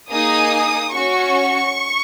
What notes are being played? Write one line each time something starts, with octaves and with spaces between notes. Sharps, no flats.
A#3 D#4 G#4 D#6
C#4 F#4 C#6